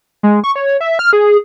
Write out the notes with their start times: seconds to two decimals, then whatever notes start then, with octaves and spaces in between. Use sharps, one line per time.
0.23 G#3
0.44 C#6
0.56 C#5
0.81 E5
0.99 F6
1.13 G#4